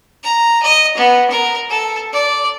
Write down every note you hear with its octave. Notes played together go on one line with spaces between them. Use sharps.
A#5
D#5
B3
A#4
A4
D5